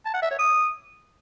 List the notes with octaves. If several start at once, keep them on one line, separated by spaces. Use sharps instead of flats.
A5
F#5
E5
C#5
D#6